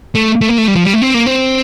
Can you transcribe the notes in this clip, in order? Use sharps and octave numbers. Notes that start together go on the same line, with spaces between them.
A3
A3
A#3
A3
G3
F3
G3
A3
C4
A#3
C4